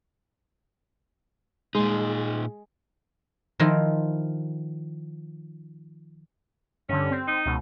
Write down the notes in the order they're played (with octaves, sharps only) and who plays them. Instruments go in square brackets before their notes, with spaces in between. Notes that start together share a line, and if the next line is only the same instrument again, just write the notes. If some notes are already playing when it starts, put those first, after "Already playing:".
[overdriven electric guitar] A#2 D#4 [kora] G#3
[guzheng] D#3 F3 E4 F4 A#4
[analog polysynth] G2 D3 [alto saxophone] C#4
[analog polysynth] C4
[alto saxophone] D#4
[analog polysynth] C#2 B2